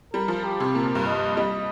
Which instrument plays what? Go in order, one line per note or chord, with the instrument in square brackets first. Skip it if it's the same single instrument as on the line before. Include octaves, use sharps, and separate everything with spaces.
[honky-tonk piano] G3 [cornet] A#4
[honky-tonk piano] F3
[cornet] G4
[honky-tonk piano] C3
[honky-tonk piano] A#2 [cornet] A#4
[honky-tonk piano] G2
[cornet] D#5
[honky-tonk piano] G3 [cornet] D#5